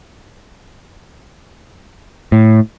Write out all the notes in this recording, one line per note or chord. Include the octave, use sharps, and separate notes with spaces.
A2